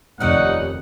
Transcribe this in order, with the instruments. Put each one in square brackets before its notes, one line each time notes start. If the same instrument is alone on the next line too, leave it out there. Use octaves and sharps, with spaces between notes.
[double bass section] F1 D#2 [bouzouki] C#4 B4 D5 [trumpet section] D#4 F#5